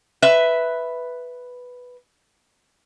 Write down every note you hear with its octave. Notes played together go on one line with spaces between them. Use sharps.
B4 E5